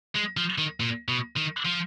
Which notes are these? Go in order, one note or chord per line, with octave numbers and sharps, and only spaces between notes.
G#3
F3
D#3
A#2
B2
D#3
F3